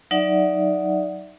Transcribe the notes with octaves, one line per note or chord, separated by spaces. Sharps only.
F#3 D#4 D5 E5 F#5